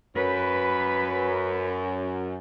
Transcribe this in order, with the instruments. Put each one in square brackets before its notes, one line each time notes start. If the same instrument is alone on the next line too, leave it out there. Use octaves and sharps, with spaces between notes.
[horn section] F#2 [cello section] B4